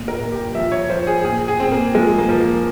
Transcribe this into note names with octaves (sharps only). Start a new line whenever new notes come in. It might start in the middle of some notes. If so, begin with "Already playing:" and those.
Already playing: A#2
A#4
A#2
G4
F3 E5
C#5
F3 C5
G#4
A#2 G#4
G#4
A#2 C4
A#3
F3 G#3
A#3
F3
A#3